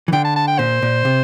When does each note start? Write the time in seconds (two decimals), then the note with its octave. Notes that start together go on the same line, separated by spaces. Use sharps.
0.08 E3
0.13 D3 G5
0.25 A5
0.36 A5
0.48 G5
0.59 A#2 C5
0.82 A#2
1.05 C3